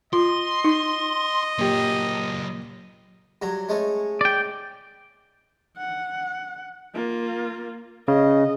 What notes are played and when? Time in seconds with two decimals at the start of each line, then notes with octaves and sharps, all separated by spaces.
0.13 F4 D#5 C6
0.64 D#4
1.59 A#2 F#3 A#3 G4
3.42 G2 F#3 A#5
3.69 G#3 A3 C#4
4.21 D5 G5
5.78 F#5
6.95 A#3 F4
8.08 C#3 D#5